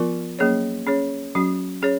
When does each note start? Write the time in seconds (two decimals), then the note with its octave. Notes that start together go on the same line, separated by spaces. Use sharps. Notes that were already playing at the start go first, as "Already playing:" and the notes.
Already playing: F3 B3 F4 A#4
0.39 F#3 A#3 C#4 G#4 C#5
0.86 C#4 G#4 C#5
1.35 F#3 C#4 F#4
1.82 C#4 G#4 C#5